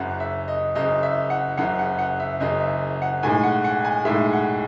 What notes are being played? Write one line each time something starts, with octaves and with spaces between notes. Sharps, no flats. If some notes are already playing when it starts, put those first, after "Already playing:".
Already playing: F#1 F#2 C#3 F#5
E5
D#5
F#1 F#2 C#3 D#5
E5
F#5
F#1 F#2 C#3 F#5
F#5
F#5
E5
F#1 F#2 C#3 D#5
E5
F#5
B1 A2 G#3 G#5
F#5
F#5
G#5
B1 A2 G#3 E5
F#5